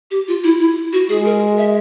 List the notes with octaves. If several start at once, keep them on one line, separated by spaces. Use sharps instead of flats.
G4
F4
E4
E4
F#4
G#3 G#4
A#4
E5